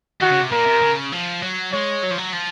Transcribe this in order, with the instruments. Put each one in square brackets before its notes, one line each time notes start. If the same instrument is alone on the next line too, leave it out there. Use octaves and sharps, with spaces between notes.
[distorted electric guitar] D#3 [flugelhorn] F#4
[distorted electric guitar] C#3
C3
[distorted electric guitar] A#2 [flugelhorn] A#4
[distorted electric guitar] C3
C#3
F3
F#3
[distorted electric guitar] G#3 [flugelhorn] C#5
[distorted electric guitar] F#3
F3
F#3
F3